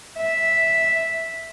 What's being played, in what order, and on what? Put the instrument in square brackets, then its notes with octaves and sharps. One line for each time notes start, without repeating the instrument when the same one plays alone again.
[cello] E5